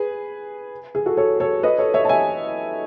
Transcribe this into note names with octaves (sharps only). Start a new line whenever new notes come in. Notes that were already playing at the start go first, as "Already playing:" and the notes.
Already playing: G#4 B4
G#4
F#4 A4
A4 C#5
A4 C#5
B4 D#5
A4 C#5
C#5 E5
A5
E5 G#5